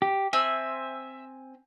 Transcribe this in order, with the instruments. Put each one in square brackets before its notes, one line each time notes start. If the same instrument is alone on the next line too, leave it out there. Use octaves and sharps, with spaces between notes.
[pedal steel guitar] G4
[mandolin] C4 G#5 E6 [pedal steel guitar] E5